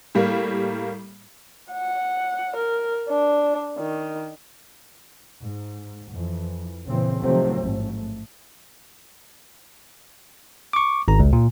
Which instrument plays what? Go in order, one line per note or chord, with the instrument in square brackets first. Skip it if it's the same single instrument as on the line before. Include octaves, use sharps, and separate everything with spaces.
[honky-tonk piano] A2 G3 A#3
[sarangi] F#5
A#4
D4
D#3
[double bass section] G#2
F2 E3
A#2 C#3 E3 C4
C3 D#3 F3 F#3 A3 C4
A1 G#2 A3
[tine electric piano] C#6 D6
G#1 A#5
C#2
A#2